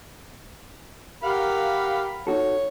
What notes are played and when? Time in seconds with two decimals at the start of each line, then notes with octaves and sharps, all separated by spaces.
1.23 G4 A#4 F5 F#5 B5
2.27 D#4 F#4 A4 C#5